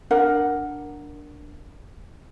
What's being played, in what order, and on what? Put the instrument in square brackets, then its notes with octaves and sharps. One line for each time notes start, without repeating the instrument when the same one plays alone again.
[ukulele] D4 A#4 F#5